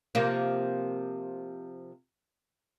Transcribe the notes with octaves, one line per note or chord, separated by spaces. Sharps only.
C3 F3 A#3